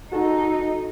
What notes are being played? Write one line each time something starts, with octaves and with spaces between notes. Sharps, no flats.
D#4 F#4 A4